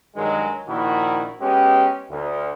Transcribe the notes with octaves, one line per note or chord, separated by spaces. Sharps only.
G2 D#3 F#3 G#3
A#1 A#2 D#3 E4 F#4
G#3 B3 C#4 G4
D2